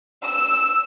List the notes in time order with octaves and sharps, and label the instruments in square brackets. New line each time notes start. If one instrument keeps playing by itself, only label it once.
[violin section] E6